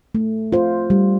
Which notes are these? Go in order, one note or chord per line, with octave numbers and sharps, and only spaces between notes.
A3
F4 C5
G3